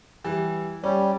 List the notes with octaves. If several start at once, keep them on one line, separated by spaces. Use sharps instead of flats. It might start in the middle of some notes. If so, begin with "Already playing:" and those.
E3 G3
G3 C#4